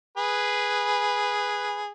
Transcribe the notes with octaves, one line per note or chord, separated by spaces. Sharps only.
G#4 B4